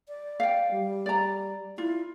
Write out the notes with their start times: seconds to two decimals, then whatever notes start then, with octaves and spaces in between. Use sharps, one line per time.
0.08 D5
0.40 F5 G5
0.71 G3
1.06 D5 A#5
1.78 E4 F4